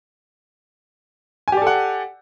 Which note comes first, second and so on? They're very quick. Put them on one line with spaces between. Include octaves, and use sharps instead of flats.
G#5 G4 D5 A4 F#5